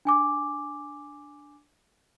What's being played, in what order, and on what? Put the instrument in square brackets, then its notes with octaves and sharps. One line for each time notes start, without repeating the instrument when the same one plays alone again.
[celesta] D4 G#5 D6